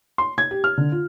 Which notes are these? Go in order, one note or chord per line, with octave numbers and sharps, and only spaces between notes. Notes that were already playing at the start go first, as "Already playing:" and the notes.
C6
G#6
G4
F6
D3
F4